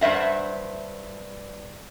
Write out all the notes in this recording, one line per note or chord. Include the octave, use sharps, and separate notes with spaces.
G2 C5 E5 F#5